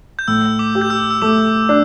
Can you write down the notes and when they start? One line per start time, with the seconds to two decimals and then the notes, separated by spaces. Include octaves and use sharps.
0.19 G6
0.28 A2 E6
0.59 D6
0.75 G4
0.81 G6
0.90 E6
1.11 E6
1.22 A3 D6
1.69 D4